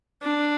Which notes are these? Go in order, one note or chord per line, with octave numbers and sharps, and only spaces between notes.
D4